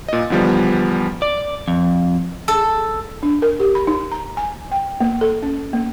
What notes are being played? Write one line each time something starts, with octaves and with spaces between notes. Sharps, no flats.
A#2 D#5
E2 D3 F3 G3 B3
D5
F2
A4
D4
A#4
G4
B5
D#4
A#5
G#5
G5
A#3
A4
C#4
A#3